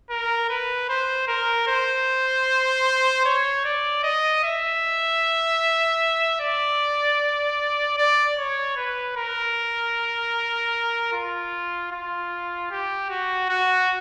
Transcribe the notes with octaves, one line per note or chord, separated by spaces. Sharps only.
A#4
B4
C5
A#4
C5
C#5
D5
D#5
E5
D5
D5
C#5
B4
A#4
F4
F4
G4
F#4
F#4